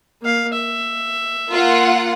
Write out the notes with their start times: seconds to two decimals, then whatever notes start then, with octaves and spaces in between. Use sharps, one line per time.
0.22 A#3 F5
0.53 E5
1.50 A#3 F4 F#5